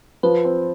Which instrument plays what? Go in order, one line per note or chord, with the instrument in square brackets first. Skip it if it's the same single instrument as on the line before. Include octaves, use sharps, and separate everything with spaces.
[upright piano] F3 [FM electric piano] B4
[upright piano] C4